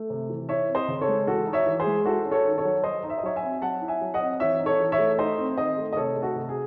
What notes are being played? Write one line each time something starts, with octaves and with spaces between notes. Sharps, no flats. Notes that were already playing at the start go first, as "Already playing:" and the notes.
Already playing: A3
C3
E3
E4 C#5 E5
C4
C5 D#5
C#3
A4 C#5
G#3
E3 F#4 A4
D#4
C#5 E5
E3
G#4 C5
G#3
E4 F#4 A4
C#4
A4 C#5
D#3
A4 C#5
F#3
F#3 C5 D#5
D#4
E5
D#5
F#3 C#5 E5
E5 G#5
C4
F#3 F#5 A5
E4
E5 G#5
F#3
D#5 F#5
C4
E3 C#5 E5
D#4
A4 C#5
E3
C#5 E5
A3
D#4 C5 D#5
C4
D#3 C5 D#5
A3
D#5
C3 A4 C#5
A3
F#4 A4
C3
G#4